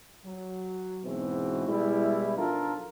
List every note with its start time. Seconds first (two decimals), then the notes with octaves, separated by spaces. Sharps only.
0.25 F#3
1.04 E2 G#2 B2 E3 C4 F#4
1.68 B2 G3 G#3 E4
2.37 B1 F3 D4 F4 A4 A#4